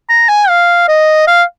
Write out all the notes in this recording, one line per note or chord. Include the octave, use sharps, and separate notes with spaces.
A#5
G#5
F5
D#5
F5